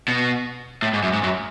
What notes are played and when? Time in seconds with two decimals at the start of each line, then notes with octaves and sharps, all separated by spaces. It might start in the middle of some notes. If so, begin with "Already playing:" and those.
0.08 B2
0.82 A2
0.93 G#2
1.03 F#2
1.13 G#2
1.23 F#2